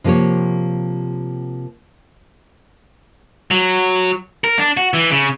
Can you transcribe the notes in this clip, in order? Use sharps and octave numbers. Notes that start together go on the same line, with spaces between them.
C3 F3 A#3 G4 C#5
F#3
A#4
D4
F#4
E3
C#3